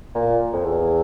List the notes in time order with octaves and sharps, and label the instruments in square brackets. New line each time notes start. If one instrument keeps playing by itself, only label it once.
[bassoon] A#2
F2
E2